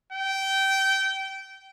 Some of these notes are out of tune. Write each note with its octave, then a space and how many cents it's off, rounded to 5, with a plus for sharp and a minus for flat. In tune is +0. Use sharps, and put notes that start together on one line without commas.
G5 -20